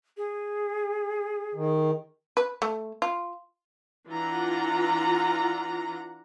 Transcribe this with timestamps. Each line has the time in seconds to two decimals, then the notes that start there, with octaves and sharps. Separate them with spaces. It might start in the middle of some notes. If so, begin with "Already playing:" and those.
0.17 G#4
1.55 D#3
2.37 B4
2.62 A3
3.02 F4
4.10 E3 D4 F4 F#5 A#5